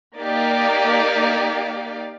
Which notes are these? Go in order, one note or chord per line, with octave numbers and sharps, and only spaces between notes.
A#3 D#4 G4 D5 F5